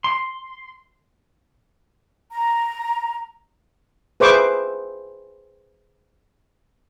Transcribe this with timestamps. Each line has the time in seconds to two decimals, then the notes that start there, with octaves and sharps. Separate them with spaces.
0.04 C6
2.32 A#5
4.20 G#4 B4 C5 E5 C#6 D6